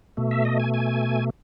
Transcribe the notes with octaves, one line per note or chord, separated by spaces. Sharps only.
B2 A3
E5
D#5
G#5
G#5